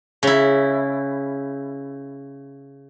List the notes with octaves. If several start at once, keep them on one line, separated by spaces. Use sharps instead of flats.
C#3 E4